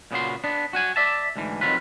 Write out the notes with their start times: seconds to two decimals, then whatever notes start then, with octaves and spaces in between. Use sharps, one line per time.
0.11 A#2 C#3 B3 F#4 C6
0.44 B3 D4
0.73 F#4 F#5 G#5
0.96 D5 E5 A5
1.36 D2 G#2 D3 E3
1.61 F2 A2 D#3 F#3 F4 B4